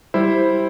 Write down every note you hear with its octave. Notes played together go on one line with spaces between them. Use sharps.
G3 E4 C5